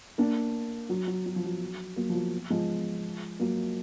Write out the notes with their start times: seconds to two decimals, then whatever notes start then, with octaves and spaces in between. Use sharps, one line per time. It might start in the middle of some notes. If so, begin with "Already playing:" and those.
0.18 A#3 D4
0.89 F#3
1.07 F#3
1.26 F#3
1.36 F3
1.45 F#3
1.96 F#3 A#3
2.10 F3
2.15 F#3
2.50 F3 G#3
3.40 F#3 A#3